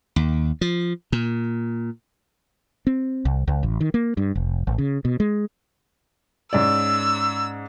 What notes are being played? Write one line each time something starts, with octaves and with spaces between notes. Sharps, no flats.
D#2
F3
A#2
C4
C2
C#2
A1
D#3
A#3
G2
F1
A1
C#3
B2
G#3
G#2 C#4 D5 E6